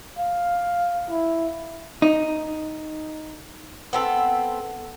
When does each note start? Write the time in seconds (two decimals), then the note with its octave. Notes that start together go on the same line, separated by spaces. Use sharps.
0.18 F5
1.10 E4
2.02 D#4
3.93 B3 C4 A4